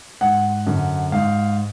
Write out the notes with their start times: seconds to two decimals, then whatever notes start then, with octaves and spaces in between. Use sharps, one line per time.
0.21 G#2 F#5
0.67 F#2 D3
1.12 G#2 F5